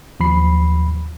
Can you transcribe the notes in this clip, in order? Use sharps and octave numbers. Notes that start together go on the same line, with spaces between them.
D#2 F3 B5 C7